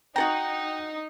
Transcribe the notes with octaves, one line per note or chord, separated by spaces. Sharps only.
D#4 F#4 A4 G5 A#5